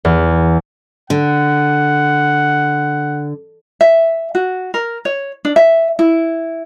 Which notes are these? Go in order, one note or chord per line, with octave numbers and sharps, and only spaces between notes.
E2
D3 F#5
E5
F#4
A#4
C#5
D4
E5
E4